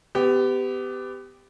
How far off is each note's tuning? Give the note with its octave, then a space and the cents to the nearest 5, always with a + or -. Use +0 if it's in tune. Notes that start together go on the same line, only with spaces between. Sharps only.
B3 +30 G4 +0